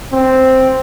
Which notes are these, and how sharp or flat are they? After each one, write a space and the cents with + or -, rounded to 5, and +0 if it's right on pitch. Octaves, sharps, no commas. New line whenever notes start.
C4 +0